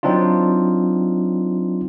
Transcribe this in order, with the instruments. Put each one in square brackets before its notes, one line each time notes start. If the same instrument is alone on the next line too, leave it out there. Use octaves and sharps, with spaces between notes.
[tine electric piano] F#3 C4 D4 D#4 F4